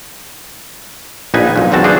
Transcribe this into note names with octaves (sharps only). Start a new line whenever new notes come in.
A#1 D#4 B4 G#5
B1 A#2
B1 E2 C4 F#4 A5
D4 G#4 C5